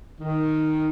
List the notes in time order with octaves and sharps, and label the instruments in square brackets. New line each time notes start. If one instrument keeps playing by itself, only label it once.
[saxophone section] D#3